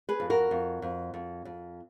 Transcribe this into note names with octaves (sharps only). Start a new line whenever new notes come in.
G#4 B4
F2
F#4 A#4
F2
F2
F2
F2